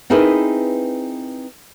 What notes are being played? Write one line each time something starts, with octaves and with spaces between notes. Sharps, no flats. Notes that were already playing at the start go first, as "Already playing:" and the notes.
C4 D#4 E4 G#4 A#4 B4